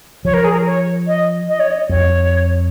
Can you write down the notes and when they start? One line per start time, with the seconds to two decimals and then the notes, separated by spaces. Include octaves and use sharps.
0.25 F3 C#5
0.34 A#4
0.44 G#4
0.52 A#4
0.66 C#5
1.07 D#5
1.48 D#5
1.60 C#5
1.71 D#5
1.89 F2 C#5